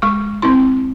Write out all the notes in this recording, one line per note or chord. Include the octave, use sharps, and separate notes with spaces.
G#3 C#6
C4 E4 C6